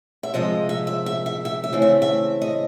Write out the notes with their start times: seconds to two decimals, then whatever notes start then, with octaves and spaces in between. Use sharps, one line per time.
0.23 E5
0.34 C3 F3 G#3 D#5
0.69 E5
0.87 E5
1.06 E5
1.26 E5
1.45 E5
1.64 E5
1.72 C#3 E3 A3 C4
1.82 E5
2.02 E5
2.42 D#5